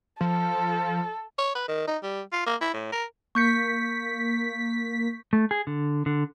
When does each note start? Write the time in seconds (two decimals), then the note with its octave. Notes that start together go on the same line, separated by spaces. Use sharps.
0.21 F3 A4
1.38 C#5
1.55 B4
1.68 D#3
1.87 D#4
2.03 G3
2.33 F4
2.46 A#3
2.61 E4
2.74 A2
2.92 A#4
3.35 A#3 C#6 G6 B6 C#7
5.33 A3
5.51 G#4
5.67 D3
6.06 D3